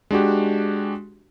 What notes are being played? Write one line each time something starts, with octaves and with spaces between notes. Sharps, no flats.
G#3 D4 F#4 G4